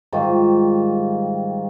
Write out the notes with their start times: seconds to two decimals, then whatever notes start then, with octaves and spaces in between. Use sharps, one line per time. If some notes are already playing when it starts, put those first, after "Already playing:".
0.12 G#2 D#3 G3 F4